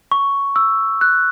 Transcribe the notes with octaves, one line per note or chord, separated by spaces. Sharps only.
C#6
E6
F#6